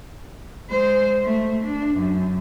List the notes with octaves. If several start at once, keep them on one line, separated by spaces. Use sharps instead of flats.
G#3 C5
A3
D4
F#2